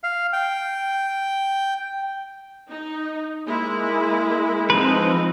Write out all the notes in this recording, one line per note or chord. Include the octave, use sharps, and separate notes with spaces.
F5
G5
D#4
G#3 A#3 E4
F3 G#3 C4 D#4 B4